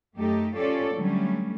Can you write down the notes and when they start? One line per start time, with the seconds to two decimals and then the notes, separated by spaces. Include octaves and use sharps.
0.17 F#2 A3 D#4 G4 A4
0.56 C#4 F4 G4 A4 C#5 D5
0.95 D3 F#3 G3 A3 C#4